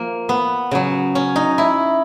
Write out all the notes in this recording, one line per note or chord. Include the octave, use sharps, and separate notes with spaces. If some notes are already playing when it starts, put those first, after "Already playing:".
Already playing: F3 A#3
B3
C#3 F#3
C#4
D#4
E4